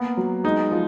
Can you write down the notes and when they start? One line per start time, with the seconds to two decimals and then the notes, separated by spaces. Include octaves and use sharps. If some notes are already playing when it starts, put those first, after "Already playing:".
Already playing: A#3 B3
0.17 F#3
0.44 G#3 D#4
0.72 F3